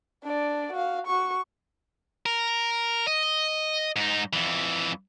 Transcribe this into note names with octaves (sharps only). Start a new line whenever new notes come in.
D4 D5
F#4 F5
F#4 C#6
A#4
D#5
G#2 D#4
F2 E3